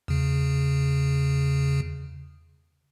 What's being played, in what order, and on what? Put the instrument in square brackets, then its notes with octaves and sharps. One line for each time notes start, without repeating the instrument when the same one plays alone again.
[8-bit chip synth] E2 C#3